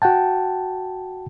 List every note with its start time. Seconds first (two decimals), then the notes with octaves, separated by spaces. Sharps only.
0.02 F#4 F#5 G5 A5